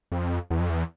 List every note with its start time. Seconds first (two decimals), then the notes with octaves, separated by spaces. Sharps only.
0.12 F2
0.50 E2
0.60 F2
0.70 E2